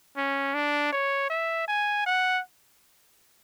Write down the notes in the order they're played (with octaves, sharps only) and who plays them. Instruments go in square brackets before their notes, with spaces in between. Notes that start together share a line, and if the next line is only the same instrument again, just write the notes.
[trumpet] C#4
D4
C#5
E5
G#5
F#5